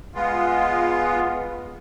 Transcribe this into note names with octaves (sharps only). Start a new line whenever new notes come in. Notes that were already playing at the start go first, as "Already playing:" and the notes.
G#3 B3 F4